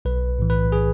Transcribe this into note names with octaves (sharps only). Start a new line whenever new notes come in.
B1 B4
A2 E3
B4
G#4